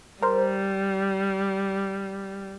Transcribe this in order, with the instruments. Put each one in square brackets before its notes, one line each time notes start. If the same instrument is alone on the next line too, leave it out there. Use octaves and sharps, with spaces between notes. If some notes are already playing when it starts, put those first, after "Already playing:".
[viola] G3 [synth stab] A#4 C5